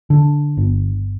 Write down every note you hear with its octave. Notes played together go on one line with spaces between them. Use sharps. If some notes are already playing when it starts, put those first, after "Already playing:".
D3
G1